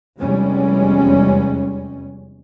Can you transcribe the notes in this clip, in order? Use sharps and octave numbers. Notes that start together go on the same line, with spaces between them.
F1 E2 G3 G#3 C#4